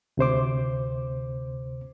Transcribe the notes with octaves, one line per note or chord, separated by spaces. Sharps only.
D2 C3 C5 D6